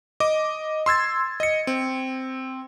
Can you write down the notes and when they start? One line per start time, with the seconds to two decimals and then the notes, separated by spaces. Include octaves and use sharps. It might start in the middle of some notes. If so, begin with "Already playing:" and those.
0.20 D#5 D6
0.86 C6 E6 G#6 A6
1.40 D#5 C#7
1.67 C4